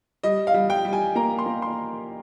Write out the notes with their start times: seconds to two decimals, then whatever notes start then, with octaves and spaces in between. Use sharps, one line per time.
0.23 G3 D#5
0.47 F5
0.54 G3
0.70 G5
0.85 G3
0.93 G#5
1.15 A#3 A#5
1.39 C6
1.46 A#3
1.62 C6